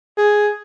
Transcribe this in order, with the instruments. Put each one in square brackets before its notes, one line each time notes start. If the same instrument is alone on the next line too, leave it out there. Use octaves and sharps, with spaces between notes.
[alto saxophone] G#4